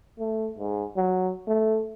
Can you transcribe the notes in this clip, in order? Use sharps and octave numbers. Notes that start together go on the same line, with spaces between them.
A3
G#2
F#3
A3